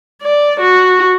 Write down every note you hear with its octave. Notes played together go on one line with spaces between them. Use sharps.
D5
F#4